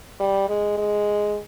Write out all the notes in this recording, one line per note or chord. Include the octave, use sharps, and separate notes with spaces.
G3
G#3
G#3